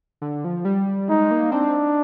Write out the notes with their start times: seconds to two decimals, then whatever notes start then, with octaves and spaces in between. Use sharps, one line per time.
0.22 D3
0.44 F3
0.65 G3
1.09 G#3 D#4
1.31 A#3
1.52 C4 D4